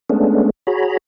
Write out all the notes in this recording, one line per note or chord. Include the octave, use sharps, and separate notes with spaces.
G#3 A3 B3 C#4 D4
F#4 G#4 C#5 A#5 B5